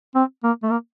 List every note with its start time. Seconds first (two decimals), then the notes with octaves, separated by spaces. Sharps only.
0.15 C4
0.43 A#3
0.63 A3
0.71 A#3